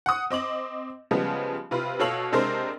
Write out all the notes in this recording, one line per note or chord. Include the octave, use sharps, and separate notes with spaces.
F#5 D#6
C4 D#5 D6 F#7
C#3 F3 G3 G#3 B3
C3 F4 B4
B2 A4 C#5 F5 E6 F#7
C3 G#3 C4 D4 A#4 C5